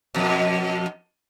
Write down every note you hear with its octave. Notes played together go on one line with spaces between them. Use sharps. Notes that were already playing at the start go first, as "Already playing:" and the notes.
F2 B2